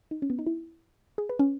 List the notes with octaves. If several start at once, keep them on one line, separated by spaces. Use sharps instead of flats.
D#4
C#4
B3
D#4
E4
G#4
B4
C#4